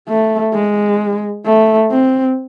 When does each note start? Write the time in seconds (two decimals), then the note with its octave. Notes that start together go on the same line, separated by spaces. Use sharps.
0.09 A3
0.54 G#3
1.46 A3
1.91 C4